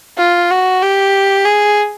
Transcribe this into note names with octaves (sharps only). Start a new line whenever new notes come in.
F4
F#4
G4
G#4